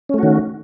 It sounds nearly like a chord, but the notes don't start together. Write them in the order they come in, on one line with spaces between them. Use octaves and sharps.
C#4 A3 F#4 D#3